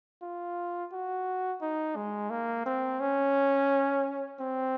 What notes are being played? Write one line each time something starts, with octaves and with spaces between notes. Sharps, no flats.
F4
F#4
D#4
G#3
A#3
C4
C#4
C4